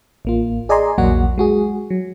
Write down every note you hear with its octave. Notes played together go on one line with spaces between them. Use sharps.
A1 A#3 F4
G#4 D5 D#5 G#5 A#5 C6
A#1 E2 F#3 A#3 F#4 F#5
G#3 F#4 G#4
F#3